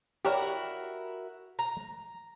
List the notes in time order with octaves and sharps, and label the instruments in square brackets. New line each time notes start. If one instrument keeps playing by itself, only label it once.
[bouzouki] E4 F#4 A#4 [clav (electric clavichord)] G4 C#5 D5
[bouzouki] A#5